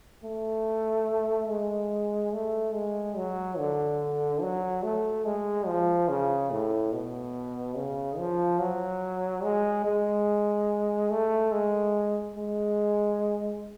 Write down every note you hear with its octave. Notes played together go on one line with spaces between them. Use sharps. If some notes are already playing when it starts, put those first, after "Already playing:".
A3
G#3
A3
G#3
F#3
D3
F#3
A3
G#3
F3
C#3
A2
B2
C#3
F3
F#3
G#3
G#3
A3
G#3
G#3